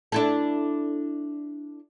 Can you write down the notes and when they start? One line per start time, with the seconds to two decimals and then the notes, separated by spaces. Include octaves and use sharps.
0.12 D4 E4 A4